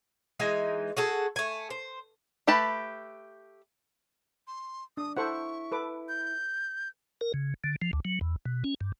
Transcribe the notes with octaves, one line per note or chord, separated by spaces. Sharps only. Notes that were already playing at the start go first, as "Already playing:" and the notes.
E3 G#3 D#4 G#5
F#4 G#4 A4
A3 G#5
C5
A3 G4 B4 A5 B5
C6
D4 D#6
E4 A4 C5 F#5 C#6
A4 B4 D6
G6
A#4
C#3
D3
F3
D2
F#3
E2
B2
C#4
G2